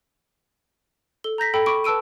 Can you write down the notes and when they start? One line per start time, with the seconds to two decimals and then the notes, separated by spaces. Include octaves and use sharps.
1.24 A4 G7
1.38 A#5 G6 A#6 B6
1.54 A4 G5 B5
1.66 B5 C#6 D6 D7
1.84 B4 A5 E6 D7 D#7